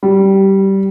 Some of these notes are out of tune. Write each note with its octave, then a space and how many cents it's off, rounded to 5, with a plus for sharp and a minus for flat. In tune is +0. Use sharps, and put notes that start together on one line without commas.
G3 -15